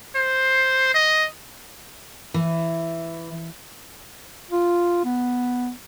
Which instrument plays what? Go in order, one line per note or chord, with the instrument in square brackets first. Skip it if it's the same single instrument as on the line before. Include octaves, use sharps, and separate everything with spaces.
[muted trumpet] C5
D#5
[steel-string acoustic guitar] E3
[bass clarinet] F4
B3